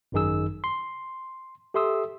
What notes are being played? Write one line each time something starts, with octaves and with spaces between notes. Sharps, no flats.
G#1 F#2 D#3 D#4 G#4 E6
C6
G4 A4 E5 C6 D#6 E6